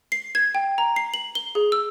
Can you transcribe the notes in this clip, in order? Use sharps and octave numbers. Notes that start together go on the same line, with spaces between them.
C7
G#6
G5
A#5
C7
F#7
G7
G#4
E6